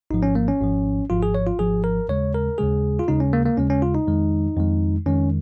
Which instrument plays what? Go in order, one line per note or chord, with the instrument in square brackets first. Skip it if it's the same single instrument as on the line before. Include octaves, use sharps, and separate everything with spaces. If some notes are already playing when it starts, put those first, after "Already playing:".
[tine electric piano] G#1 G#2 F3 D#4
C#4
A#3
C#4
G#1 G#2 F3
G#1 G#2 F3 F4
G#4
C#5
F4
G#1 G#2 F3 G#4
A#4
D#2 C#3 G#3 C#5
A#4
D#2 C#3 G#3 G#4
F4
D#2 C#3 G#3 D#4
C#4
A#3
A#3
D#2 C#3 G#3 C#4
C#4
F4
D#4
F2 D#3 G#3
F2 D#3 G#3
F2 D#3 G#3 C#4